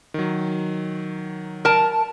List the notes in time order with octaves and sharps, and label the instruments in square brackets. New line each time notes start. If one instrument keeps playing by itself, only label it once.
[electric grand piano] D#3 F#3
[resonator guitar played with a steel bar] A#4 A5